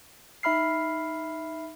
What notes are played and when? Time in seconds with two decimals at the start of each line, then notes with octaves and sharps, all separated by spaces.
0.43 D#4 E5 B5 F6 C7